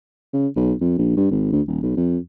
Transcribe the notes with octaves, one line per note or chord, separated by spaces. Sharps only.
C#3
B1
F2
A#1
G2
G#1
D2
D#1
B1
F2